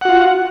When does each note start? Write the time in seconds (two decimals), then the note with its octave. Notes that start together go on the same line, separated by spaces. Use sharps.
0.01 F#5
0.05 F#4
0.09 F4